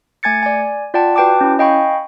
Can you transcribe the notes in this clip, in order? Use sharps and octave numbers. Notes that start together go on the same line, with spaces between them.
A3 G#5 G#6 A6 C#7
D5 G#5
F4 D5 F#5 G5 A5
F#4 B4 G5 A5 D6
C#4 E4
D#5 F5 G5 G#5 B5 C#6